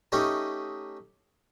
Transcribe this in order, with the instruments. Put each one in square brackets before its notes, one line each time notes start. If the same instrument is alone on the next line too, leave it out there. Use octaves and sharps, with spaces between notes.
[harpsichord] A3 C#4 D#4 G4